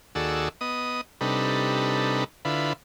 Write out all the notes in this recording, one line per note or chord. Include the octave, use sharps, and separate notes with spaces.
D#2 F#4 G#4 A4 D5 E6
B3 D#5 D#6
C3 G3 D4 D#4 A4 B4
D3 E4 F4 B4